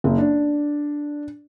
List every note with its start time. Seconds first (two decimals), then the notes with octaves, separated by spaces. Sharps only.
0.04 F#1
0.18 D4